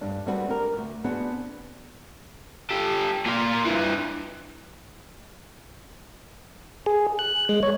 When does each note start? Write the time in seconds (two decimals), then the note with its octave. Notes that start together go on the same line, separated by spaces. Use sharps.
0.01 G2 D4
0.26 G3 C4 D4 F#4 B4
0.50 G4 A#4
0.73 D2 G2
1.04 B3 C4 D4 F#4 G#4
2.71 G4 A4
3.26 A#2 F4
3.65 G2 E3
6.86 G#4
7.19 F#6
7.49 G#3
7.63 C#5